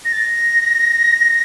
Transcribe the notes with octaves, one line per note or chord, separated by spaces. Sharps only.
A#6
A6
A#6